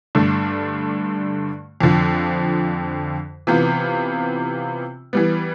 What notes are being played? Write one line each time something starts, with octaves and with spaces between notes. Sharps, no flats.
G2 D3 A3 D4
F2 D3 F3
C3 E3 B3 F4
E3 G3 B3